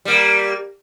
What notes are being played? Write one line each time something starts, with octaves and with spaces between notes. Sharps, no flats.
G3 A#3